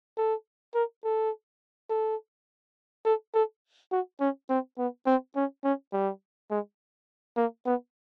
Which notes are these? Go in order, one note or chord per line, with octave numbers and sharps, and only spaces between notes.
A4
A#4
A4
A4
A4
A4
F#4
C#4
C4
B3
C4
C#4
C#4
G3
G#3
A#3
B3